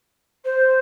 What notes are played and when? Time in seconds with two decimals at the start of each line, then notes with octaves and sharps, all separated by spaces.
0.44 C5